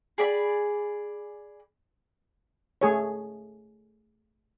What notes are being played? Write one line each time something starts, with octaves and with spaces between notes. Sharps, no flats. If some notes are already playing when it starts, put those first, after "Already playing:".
G#4 D5 B5
A3 G#4 C#5